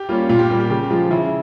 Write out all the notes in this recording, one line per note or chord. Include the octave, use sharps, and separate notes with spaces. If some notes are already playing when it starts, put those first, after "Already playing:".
Already playing: G4
G3 A#3 C#4 F4
A#2 F4
G4
G3 A#3 F4
G4
C#3 G4
F3 G#3 F4
C#3 E4